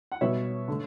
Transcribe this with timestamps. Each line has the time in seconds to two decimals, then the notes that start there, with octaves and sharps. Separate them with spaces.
0.12 F#5
0.21 B2 G3 B3 C#5 E5
0.68 D3 A3